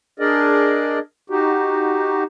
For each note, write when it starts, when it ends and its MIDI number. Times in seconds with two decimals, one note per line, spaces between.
0.19 0.99 62
0.19 0.99 68
0.19 0.99 70
0.19 0.99 74
0.19 0.99 75
1.30 2.23 63
1.30 2.23 66
1.30 2.23 67